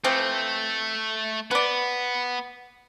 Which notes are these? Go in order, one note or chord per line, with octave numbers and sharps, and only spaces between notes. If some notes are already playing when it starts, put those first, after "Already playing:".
E3 F3 A3 C4
B3 B4 D5